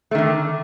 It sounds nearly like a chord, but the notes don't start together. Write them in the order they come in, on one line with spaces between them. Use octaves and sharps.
A3 D#3 D3